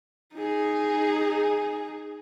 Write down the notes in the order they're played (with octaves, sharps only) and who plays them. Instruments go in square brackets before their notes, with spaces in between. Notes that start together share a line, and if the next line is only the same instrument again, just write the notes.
[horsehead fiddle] D#4 G#4